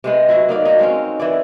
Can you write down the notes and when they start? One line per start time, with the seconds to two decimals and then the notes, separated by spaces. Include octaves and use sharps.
0.04 C3 G#3 B3
0.29 F#3 E4 F#4
0.49 A#3 D#4 D5
0.65 D#4 F#4
0.79 G#3 C4 C#4
1.20 E3 E4 D5